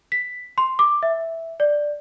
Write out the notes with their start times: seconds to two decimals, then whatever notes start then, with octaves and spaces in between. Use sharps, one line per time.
0.12 B6
0.58 C6
0.79 D6
1.03 E5
1.60 D5